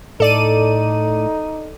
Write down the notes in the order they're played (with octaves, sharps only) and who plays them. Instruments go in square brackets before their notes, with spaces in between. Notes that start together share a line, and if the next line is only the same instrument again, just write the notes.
[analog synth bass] A2 [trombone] D#4 [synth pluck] A4 D5 D#7